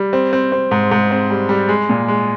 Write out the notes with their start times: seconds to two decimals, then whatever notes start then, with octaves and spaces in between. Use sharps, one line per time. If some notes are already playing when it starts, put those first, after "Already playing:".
Already playing: G3
0.13 C4
0.33 C4
0.52 C4
0.71 G#2
0.91 G#2
1.11 C4
1.30 G3
1.49 G3
1.69 G#3
1.89 A#2
2.08 G#3